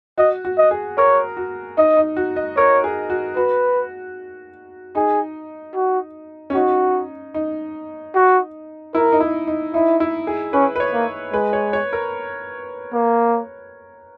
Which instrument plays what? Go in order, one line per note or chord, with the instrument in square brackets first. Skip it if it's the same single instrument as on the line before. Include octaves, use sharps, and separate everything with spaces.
[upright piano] F#4 [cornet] D#5
[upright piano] F#4
[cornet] D#5
[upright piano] G#4
[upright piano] A#4 [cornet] C#5
[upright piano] F#4
[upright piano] D#4 [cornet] D#5
[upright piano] D#4
F#4
D#5
[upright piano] A#4 [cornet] C#5
[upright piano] G#4
F#4
[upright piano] F#4 [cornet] B4
[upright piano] D#4 [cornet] G#4
[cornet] F#4
[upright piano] C#4
[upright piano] D#4 [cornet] F#4
[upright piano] D#4
[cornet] F#4
[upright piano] E4 [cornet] A#4
[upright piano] D#4
E4
D#4
[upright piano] D#4 [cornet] E4
[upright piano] E4
G#4
[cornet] C#4 [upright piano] B4
[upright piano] B4
C#5
[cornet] A#3
[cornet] G#3 [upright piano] B4
[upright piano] C#5
C#5
A#4
[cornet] A#3